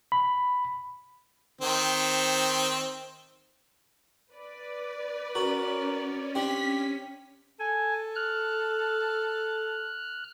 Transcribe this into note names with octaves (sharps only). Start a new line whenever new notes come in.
B5
D#3 C4
B4 D5
C#4 F#4 A#4
C4 D4 G4 B6
A4 G#5
F6 F#6